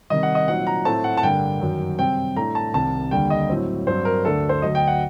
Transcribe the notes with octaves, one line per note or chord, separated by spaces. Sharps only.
C3 D#3 G3 D#5
F#5
D#5
A#2 F#3 C4 D#4 F#5
A#5
A2 A3 C4 A5
F#5
A5
G2 D3 G3 A#3 D4 G5
F#2 D#3 F#3
C3 G3 C4 G5
A2 A3 D4 A#5
A5
C2 C3 D#3 A5
D#2 D3 G3 D4 G5
D#5
A2 F#3 C4
G2 F#3 C4 C5
A#4
D2 D3 A3 D4 A4
C5
D2 D3 F#3 D#5
G5
F#5